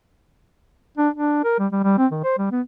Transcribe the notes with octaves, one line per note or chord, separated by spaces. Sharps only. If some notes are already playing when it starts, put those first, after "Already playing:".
D4
D4
A#4
G3
G3
G3
C4
D#3
C5
G3
B3